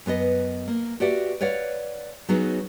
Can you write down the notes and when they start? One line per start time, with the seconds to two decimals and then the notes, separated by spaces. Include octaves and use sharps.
0.06 F#2 B3 B4 D#5
0.68 A#3
1.00 F#4 G4 B4 D5 E5 F#5
1.41 B4 C#5 D5 F5 F#5
2.29 F#3 B3 C#4 D#4 F#4 G#4